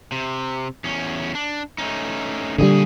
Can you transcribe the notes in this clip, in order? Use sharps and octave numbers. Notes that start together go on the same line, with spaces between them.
C3
E2 C#4
D4
A3 C#4 D#4
A#2 D3 D#3 G3 G#4